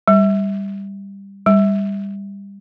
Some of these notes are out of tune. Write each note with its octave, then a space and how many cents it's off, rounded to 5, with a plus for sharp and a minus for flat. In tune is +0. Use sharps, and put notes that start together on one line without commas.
G3 +10
G3 +20